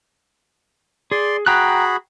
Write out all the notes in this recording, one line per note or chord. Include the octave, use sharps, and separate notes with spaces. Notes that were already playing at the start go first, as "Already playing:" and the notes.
G#4 D5 C6
F#4 G#4 G5 A#5 B5 F#6